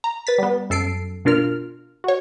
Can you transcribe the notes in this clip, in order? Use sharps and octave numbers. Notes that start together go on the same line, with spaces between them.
A#5
B4 A6 B6
G3 B3
F#2 A4 C7 D7
B2 D4 F4 A#4 F6
F#4 C#5